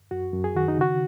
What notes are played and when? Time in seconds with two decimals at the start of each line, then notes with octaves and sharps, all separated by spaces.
0.11 F#2 F#4
0.33 F#2
0.44 G#4
0.55 D#3 F#4
0.68 D#4
0.77 C#3 F#4